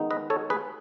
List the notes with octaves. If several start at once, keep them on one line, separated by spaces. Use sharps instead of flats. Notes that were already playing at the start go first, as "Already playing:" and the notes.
Already playing: D#3 G#3 B3 D#4
B4 D#5
A4 C#5
G#4 B4